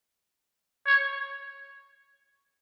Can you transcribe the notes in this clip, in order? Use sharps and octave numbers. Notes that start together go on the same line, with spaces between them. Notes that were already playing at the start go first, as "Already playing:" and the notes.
C#5